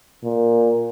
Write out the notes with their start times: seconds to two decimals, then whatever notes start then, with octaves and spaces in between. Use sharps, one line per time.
0.24 A#2